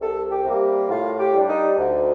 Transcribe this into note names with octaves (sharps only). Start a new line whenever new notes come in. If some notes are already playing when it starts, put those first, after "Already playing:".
C2 A4
G4
C3 G3 A#3
A2 F4
G4
G3 D4
D#4
D2